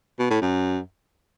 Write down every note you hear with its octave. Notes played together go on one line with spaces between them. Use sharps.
B2
A2
F#2